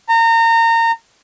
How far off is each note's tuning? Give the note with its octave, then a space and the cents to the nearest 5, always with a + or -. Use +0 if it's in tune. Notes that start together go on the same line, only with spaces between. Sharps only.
A#5 -30